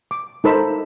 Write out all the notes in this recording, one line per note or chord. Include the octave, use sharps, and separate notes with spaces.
D6
D#4 A4 A#4 C5 B5 E6